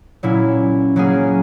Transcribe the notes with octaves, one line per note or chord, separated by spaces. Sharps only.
A#2 F#3 C#4 E4
F#3 A#3 C#4 G#4